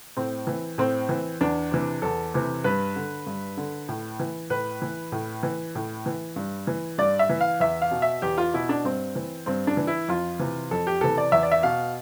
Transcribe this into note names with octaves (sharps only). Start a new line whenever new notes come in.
A2 C4
E3
A2 C4
E3
E2 D4
C3 E3
E2 A4
C3 E3
G2 B4
D3
G2
D3
A2
E3
A2 B4
E3
A2
E3
A2
E3
G2
E3
G2 D5
E5
E3
F5
E2 E5
F5
B2
E5
E2 G4
F4
B2 E4
D4
G2 C4
E3
G2 C4
D4
E3
E4
F2 F4
C3 E3
F2 A4
G4
C3 E3 A4
D5
E2 E5
D5
E5
B2 F5